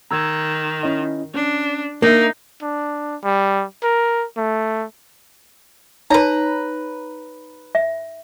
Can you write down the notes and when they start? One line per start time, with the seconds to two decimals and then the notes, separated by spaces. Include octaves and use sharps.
0.11 D#3 A#5 E6 G#6
0.83 C#4 E4 D#5
1.34 C#4 D4
2.02 A#3 D4 D#4 E5
2.62 D4
3.24 G3
3.83 A#4
4.37 A3
6.10 D#4 B4 C#5 A#5
7.75 E5